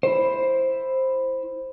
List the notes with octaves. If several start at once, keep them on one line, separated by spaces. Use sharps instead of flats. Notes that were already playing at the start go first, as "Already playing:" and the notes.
E4 C5